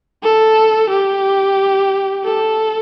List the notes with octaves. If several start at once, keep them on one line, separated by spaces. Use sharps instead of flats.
A4
G4
A4